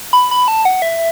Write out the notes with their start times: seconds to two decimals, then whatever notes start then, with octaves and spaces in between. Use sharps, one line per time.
0.13 B5
0.31 B5
0.48 A5
0.65 F#5
0.82 E5